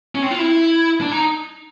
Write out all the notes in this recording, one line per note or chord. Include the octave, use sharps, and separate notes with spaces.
C#4
C4
F4
E4
D4
D#4